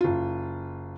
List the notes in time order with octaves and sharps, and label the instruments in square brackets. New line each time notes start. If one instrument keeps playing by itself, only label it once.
[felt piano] F#1 F4